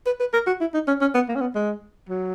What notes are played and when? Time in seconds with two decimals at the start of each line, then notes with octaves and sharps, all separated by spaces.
0.06 B4
0.20 B4
0.33 A#4
0.47 F#4
0.60 E4
0.74 D#4
0.87 C#4
1.01 C#4
1.14 B3
1.28 A#3
1.35 C#4
1.41 B3
1.55 G#3
2.09 F#3